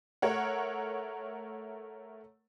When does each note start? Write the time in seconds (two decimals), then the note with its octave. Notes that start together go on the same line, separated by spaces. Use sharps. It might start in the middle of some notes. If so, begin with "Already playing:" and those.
0.22 A3 A#4 C#5 F#5